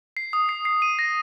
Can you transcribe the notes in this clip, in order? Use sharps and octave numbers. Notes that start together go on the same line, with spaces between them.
C7
D#6
C7
C7
D#7
A#6